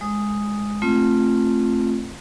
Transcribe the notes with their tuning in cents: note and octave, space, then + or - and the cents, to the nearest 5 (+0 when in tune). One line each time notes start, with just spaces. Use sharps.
G#3 +0 D#6 +0
A3 +0 C4 +20 F4 -10